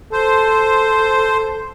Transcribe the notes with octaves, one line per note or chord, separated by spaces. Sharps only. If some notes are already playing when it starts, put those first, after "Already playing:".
A4 C5